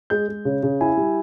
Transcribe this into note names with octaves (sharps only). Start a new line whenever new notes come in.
G#3 G6
G#3
C#3
C#3
E4 G#5
G3